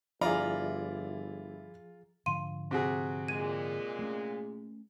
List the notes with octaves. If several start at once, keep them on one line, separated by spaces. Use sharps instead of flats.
G1 F3 E4 F4 G#4 D5 A#5
G#2 D3 F3 F5 C6 D#7
C3 F#4 G#4
A#2 G#3 G#6 D#7
A3 A#3 C#4